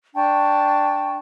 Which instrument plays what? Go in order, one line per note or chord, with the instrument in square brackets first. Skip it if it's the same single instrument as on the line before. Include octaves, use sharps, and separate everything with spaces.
[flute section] D4 G5 A5 C#6